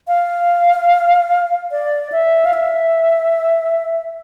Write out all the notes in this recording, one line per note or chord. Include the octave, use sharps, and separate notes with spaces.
F5
D5
E5
F5
E5